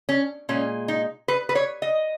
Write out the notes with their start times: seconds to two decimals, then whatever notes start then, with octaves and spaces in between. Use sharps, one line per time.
0.09 C#4
0.49 A#2 G#3 C#4
0.88 D#4
1.28 B4
1.49 B4
1.55 C#5
1.82 D#5